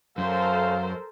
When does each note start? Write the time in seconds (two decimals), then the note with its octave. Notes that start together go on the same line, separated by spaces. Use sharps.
0.18 F#2 A4 A#4 C5 F5